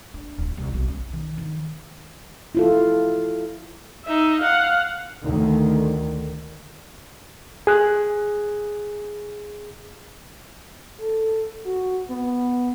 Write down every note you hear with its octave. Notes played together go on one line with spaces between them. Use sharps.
D4
D1
C2
B1
C#4
D#3
D#3
E4 F4 A4
D#4 E5
F5 F#5
D2 D3 D#3
G#4 F#6
A4
F#4
B3